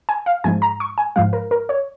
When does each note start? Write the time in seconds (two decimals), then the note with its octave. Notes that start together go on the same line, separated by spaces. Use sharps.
0.09 G#5
0.26 F5
0.44 G#2 F3 G#3 G#5
0.62 A#5
0.80 C#6
0.98 G#5
1.16 G#2 F3 G#3 F5
1.33 A#4
1.51 A#4
1.69 C#5